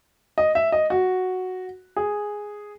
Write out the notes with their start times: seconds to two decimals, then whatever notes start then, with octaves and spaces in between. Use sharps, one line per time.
0.38 D#5
0.55 E5
0.72 D#5
0.90 F#4
1.96 G#4